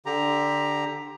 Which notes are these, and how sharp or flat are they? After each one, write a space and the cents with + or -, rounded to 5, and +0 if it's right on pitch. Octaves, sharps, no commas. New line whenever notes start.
D3 +0 G4 +15 A#5 +5